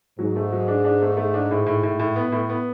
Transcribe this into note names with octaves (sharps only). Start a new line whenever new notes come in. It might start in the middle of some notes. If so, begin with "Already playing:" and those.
G#2 F#3
A3
F#3
D4
D4
A3
A3
D4
A2
A2
A2
A2
B3
A2
B3